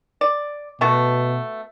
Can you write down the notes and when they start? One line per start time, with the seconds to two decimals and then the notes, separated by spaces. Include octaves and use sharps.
0.21 D5
0.81 B2 A3 B3 F#4